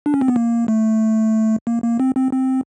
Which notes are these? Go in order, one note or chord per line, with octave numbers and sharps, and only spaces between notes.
D4
C#4
C4
B3
A#3
A3
A#3
A#3
C4
C4
C4